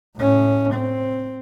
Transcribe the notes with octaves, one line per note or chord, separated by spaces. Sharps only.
A2 C#4
C4